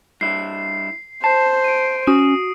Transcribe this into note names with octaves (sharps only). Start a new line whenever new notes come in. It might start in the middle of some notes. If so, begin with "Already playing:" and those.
G2 E4 C7
C5 A5 C7
D7 D#7
C#4 F#4 D#6